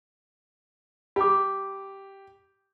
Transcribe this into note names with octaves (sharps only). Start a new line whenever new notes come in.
G4 B5 D6